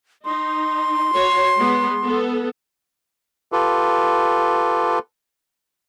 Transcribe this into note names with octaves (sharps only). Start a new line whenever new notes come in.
D#4 C6
F#4 C#5
G#3 B3
B3 A4
F4 G4 A4 B4